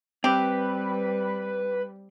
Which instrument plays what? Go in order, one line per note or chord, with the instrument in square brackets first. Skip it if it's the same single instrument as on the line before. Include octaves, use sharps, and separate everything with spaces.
[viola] G3 [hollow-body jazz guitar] C4 [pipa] G4 [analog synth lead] B4